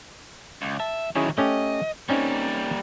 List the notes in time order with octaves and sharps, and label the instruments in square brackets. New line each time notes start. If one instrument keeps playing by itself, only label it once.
[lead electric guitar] C#2
[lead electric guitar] E5 [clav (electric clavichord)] A5
[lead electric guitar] D#3 F#3 [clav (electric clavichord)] C#4 E4 G#4
[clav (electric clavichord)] A3 C#4 G4 [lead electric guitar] D#5
[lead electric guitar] G3 A#3 [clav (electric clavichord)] C4 C#4 D#4